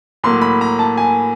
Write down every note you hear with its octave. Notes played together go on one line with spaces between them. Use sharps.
A2 F#3 A#3 C6
B5
A#5
A5
G#5